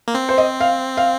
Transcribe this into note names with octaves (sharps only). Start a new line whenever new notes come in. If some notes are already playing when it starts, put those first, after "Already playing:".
A#3
C4
C5
D#5
F5
F5